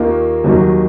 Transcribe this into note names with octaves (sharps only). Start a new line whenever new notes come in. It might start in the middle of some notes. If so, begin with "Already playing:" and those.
Already playing: D#2 D#3 A#3 F4
D#2 D#3 F#3